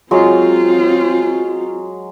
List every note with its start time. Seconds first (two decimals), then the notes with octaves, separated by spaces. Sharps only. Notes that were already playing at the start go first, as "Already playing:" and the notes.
0.11 F#3 G#3 C4 F4